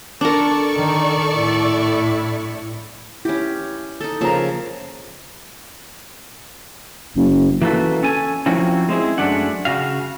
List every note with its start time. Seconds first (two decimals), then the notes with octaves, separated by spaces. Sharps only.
0.21 D4 A4 A#4 D5 C#6
0.74 D#3
1.36 A2 E4
3.25 C#4 E4 G4
4.01 D#4 A4
4.21 C#3 F3 A#3 E5 A#5
7.16 F#1
7.62 E3 A#3 F#4 A4 B4
8.02 C#4 A4 G#5
8.46 F3 F#3 A#3 C4 C#4 E4
8.89 G#3 C4 E4 G#4
9.18 F#2 E3 G#3 A3 D4 F#5
9.65 C#3 F#4 F5